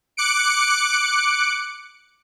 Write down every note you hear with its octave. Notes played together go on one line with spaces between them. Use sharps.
D6 F#6 C#7 D7